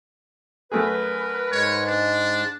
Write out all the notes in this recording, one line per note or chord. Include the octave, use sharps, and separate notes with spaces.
F#2 A3 G#4 A#4 B4
G#2 G#3 C#5
D4